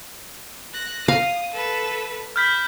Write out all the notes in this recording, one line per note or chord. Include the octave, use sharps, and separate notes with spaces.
F#6 A#6
F5 D#6
A4 B4
B5 F6 G6 B6